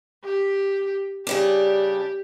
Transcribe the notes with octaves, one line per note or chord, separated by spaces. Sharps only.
G4
C#3 G3 D4 G4